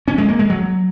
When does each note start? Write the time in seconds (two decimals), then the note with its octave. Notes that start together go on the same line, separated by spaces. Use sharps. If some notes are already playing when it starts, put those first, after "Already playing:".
0.08 C#4
0.18 G#3
0.29 A#3
0.39 G#3
0.50 F#3